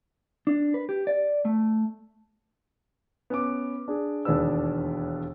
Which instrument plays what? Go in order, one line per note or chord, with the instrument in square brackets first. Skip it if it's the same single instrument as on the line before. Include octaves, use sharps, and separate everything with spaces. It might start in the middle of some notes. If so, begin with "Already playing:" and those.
[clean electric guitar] D4
B4
G4
D5
A3
[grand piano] B3 C#4 D6
D4 G#4
E1 D#2 D4 G#4 B4 E6